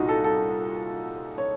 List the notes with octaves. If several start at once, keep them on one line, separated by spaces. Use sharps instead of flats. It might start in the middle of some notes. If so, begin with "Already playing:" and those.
Already playing: C2 A#2 D#4 F4 F#4
A4
A4
C#5